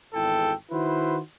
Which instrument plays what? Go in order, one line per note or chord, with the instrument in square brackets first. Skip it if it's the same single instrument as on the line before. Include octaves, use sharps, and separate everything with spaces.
[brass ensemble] G#1 E2 E4 A4 G5
D#3 E4 F#4 B4 C5